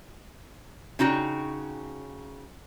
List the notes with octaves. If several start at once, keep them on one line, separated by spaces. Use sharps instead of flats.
C#3 D#4 F#4 G5